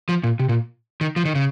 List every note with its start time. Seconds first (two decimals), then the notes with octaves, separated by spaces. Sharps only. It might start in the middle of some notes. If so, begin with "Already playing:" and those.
0.09 F3
0.24 A#2
0.39 C3
0.49 A#2
1.01 D#3
1.16 F3
1.25 D#3
1.35 C#3